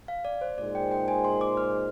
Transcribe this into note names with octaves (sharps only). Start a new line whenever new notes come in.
F5
D5
C5
A#2 G#3 D#4 G#4 C5 D5
G5
G5
G#5
C6
D6
F6